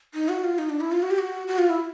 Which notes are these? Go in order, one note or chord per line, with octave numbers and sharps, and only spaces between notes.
D#4
F#4
F4
D#4
D4
E4
F4
F#4
G4
F#4
F#4
F4
E4